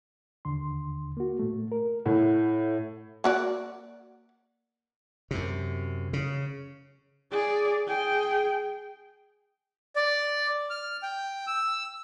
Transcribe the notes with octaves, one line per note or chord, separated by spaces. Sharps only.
D#2 D3 C6
A#3 F#4
A2 A3
A#4
A2 F#5
A#3 F#4 D5
F#2 C3
C#3
G#4 D5
G#4 G5
D5
F6
G5
E6